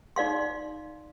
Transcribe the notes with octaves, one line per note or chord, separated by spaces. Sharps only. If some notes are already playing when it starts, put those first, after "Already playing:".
D#4 D5 F5 C6